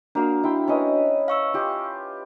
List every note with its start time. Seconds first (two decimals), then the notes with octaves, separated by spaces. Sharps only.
0.15 A#3 D4 F#4 F5
0.43 E4 G5 C6
0.68 C#4 B4 D#5
1.28 F5 C#6 E6
1.54 F4 G4